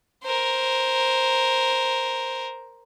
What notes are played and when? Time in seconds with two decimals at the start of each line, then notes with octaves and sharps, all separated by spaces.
0.23 A#4 C5